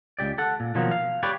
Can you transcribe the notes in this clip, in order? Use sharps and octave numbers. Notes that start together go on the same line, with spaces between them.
C#2 G4 D5
A4 F#5
A#2
B2 D#3 F3 F#3 A#3
F5
G4 B4 C#5 D5